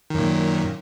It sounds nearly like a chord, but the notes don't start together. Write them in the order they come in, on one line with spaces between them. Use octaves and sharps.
D#3 F#2 A#2